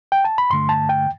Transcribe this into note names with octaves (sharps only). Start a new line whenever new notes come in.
G5
A5
B5
G2 D3 A3 C6
A5
G5